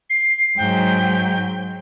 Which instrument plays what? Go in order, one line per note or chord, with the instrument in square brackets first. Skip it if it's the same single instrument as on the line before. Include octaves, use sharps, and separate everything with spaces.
[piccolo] C7
[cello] G#2 F#3 [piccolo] G5